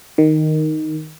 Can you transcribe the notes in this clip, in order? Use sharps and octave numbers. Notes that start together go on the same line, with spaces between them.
D#3